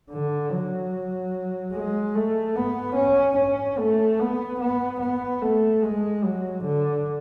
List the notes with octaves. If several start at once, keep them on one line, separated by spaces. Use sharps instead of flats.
D3
F#3
G#3
A3
B3
C#4
C#4
A3
B3
B3
B3
A3
G#3
F#3
D3